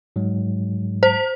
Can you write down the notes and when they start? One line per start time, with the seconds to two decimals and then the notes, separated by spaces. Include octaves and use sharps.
0.16 G#2 F#3 G#3
1.03 C5